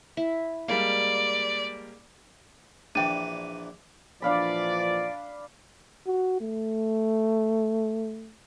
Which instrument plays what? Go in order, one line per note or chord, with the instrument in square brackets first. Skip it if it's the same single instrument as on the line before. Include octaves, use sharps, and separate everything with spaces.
[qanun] E4
[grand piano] G3 G#3 A#3 [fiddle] D5 [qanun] F5
[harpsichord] A#1 E3 [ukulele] D4 G5 [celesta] D#7
[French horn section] A#2 E3 F3 [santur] D4 F5 B5 [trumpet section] D5
[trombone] F#4
A3